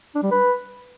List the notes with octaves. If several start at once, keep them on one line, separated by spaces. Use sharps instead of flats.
D4
G3
B4